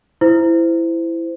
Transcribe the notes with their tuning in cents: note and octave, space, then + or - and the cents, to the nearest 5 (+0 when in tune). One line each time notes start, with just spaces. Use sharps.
E4 +10 C5 -20